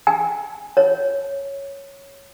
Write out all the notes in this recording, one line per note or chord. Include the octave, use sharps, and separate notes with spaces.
G#5
C#5